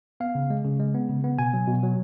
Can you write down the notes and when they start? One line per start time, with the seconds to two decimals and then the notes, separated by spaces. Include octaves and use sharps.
0.20 B3 F5
0.35 C#3
0.50 G#3
0.64 C#3
0.80 G#3
0.94 B3
1.09 C#3
1.24 B3
1.38 B2 G#5
1.53 F#3
1.68 B2
1.83 F#3